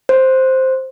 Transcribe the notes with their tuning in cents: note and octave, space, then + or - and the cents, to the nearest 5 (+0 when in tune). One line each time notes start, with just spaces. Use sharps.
C5 +0